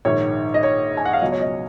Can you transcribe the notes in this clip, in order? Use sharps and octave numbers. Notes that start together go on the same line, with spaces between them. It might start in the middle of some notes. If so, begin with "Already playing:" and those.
A#1 G#2 D#3 C#5
D#5
C#5
G#5
F#5
F5
C#2 B2 F#3 D#5
C#5
D#5